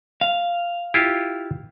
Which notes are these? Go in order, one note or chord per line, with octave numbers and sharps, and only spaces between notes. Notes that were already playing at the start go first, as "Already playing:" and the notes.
F5
E4 F4 G4